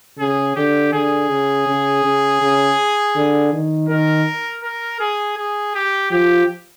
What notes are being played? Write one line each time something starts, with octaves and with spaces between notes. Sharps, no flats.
C#3 G#4
D3 G4
D3 G#4
C#3
C#3
C#3
C#3
D3
D#3
D#3 A#4
A#4
G#4
G#4
G4
F3 G4